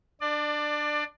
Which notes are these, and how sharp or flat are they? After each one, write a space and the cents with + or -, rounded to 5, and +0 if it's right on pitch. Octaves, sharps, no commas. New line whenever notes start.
D4 +10 D5 +25